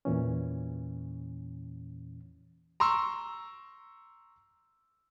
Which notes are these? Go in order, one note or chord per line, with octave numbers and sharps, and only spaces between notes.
E2 A#2 E3 C#4
A#5 C6 C#6 E6